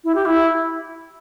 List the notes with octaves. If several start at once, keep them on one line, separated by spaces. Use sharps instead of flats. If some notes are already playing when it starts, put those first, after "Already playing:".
E4
G4
E4